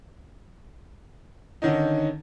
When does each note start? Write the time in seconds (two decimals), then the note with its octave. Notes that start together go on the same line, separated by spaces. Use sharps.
1.62 D3 D#3 C#4 D#4